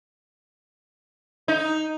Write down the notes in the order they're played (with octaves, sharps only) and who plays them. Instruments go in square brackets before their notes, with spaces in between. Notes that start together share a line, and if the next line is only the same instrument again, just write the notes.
[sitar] D#4